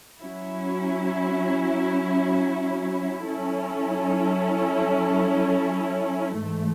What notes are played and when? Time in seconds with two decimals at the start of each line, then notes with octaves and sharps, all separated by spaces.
0.20 F#3 C#4 E4
3.30 F#3 C#4 E4 A4
6.40 G#2 E3 A3